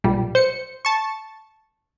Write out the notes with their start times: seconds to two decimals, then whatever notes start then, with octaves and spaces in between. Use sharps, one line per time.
0.04 B1 A#2 G3
0.35 C5 C#7
0.85 A5 C#6